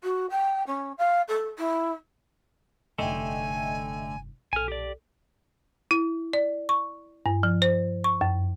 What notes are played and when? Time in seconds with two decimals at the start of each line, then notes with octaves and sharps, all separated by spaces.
0.03 F#4
0.30 G5
0.67 C#4
0.98 F5
1.28 A4
1.58 E4
2.98 F1 G2 D3 A3 D#5 E5 G5 G#5
4.53 B1 A#2 A4 G#5 F6
4.68 G4 D5
5.91 E4
6.33 D5
6.69 C#6
7.26 G2
7.43 F3
7.62 C5
8.04 C#6
8.21 F#2